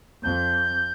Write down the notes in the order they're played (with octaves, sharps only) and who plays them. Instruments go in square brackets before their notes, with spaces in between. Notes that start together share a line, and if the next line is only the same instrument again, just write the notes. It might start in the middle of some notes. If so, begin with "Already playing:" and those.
[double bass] F2 [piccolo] G6